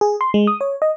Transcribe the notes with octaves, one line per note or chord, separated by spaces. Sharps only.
G#4
C6
G#3
D#6
C#5
D#5